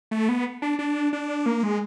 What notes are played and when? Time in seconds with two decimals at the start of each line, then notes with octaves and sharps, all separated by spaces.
0.11 A3
0.29 B3
0.62 D4
0.79 D4
1.13 D4
1.46 A#3
1.63 G#3